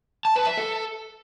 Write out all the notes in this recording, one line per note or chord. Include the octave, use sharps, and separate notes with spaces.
A5
B4
E5
A4